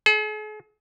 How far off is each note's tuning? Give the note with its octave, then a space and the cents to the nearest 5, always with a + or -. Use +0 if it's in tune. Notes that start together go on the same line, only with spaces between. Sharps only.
G#4 +45